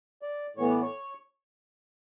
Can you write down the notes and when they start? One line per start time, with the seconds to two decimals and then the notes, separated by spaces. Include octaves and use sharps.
0.22 D5
0.56 A2 E3 B3 C#5
0.69 D5
0.81 C#5